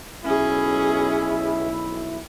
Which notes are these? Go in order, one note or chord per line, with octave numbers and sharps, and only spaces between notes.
B1 C#4 E4 G#4